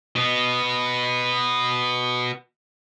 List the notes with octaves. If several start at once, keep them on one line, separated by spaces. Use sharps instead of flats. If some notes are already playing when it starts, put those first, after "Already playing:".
B2 B3